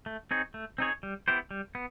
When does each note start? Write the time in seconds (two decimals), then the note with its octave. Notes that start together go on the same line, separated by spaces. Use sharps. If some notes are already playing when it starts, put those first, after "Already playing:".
0.06 A3
0.31 C4 D#4 G#4 C#5
0.54 A3
0.78 C4 D#4 G#4 C#5
1.03 G3
1.28 B3 E4 G4 C5
1.51 G3
1.75 B3